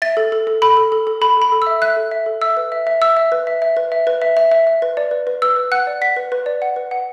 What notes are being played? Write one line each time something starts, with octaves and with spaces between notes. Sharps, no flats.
E5 A6
A4
A4
A4
A4 B5
A4
A4
A4
A4 B5
A4 B5
A4
E5 E6
E5 F#6
A4
E5
A4
E5 E6
B4
E5
E5
E5 E6
E5
B4
E5
E5
B4
E5
B4
E5
E5
E5
E5
B4
D5
B4
B4
B4 E6
B4
F#5 F#6
D5
F#5 B6
B4
B4
D5
F#5
B4
F#5